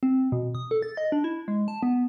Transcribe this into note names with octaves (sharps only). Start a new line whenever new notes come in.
C4
B2
D#6
A4
A6
D#5
D4
E4
G#3
A5
B3